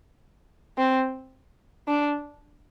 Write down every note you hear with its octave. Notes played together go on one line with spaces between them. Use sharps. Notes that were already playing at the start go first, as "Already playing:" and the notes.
C4
D4